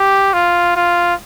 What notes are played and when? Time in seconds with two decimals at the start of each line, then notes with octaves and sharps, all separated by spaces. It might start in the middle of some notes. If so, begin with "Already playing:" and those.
Already playing: G4
0.33 F4
0.76 F4